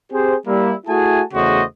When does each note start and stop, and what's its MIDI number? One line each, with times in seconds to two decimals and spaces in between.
0.11 0.35 60
0.11 0.35 67
0.11 0.35 68
0.11 0.35 72
0.47 0.73 55
0.47 0.73 58
0.47 0.73 64
0.87 1.21 57
0.87 1.21 64
0.87 1.21 66
0.87 1.21 68
0.87 1.21 80
0.87 1.21 81
1.34 1.62 40
1.34 1.62 49
1.34 1.62 57
1.34 1.62 66
1.34 1.62 72
1.34 1.62 75